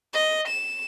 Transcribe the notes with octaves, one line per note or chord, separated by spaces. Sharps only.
D#5
E7